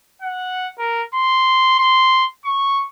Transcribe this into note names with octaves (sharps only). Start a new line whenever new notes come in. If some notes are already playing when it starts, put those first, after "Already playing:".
F#5
A#4
C6
C6
C#6